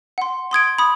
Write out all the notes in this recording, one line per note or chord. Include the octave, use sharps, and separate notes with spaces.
F#5 C6
C6 D#6 G#6 D7
B5 D#6